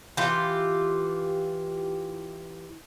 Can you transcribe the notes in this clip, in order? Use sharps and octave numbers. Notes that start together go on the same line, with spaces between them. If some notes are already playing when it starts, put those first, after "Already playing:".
E3 F4 G4